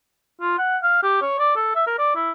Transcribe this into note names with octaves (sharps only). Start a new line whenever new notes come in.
F4
F#5
F5
G4
C#5
D5
A4
E5
A#4
D5
E4